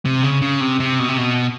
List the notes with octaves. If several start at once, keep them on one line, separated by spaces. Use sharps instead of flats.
C3
C#3
C#3
C3
C3
B2
C3
B2